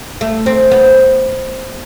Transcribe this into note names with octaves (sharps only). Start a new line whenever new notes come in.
A3
C4
B3